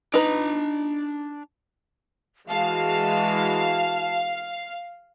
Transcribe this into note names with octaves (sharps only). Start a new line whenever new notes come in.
D4 D#4 B4 A#5
E3 G#3 F#4 F5 A5